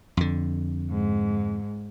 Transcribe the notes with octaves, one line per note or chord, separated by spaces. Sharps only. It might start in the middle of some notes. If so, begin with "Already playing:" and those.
F2 D3
G#2